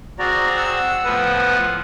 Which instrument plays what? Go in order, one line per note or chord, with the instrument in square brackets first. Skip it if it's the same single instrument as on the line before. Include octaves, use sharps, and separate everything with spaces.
[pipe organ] C4 G#4 [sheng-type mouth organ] F#4 D5 A#5
[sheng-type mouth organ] F#5 E6
[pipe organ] A2 F3 B3 [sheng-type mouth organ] B4 F#5 D#6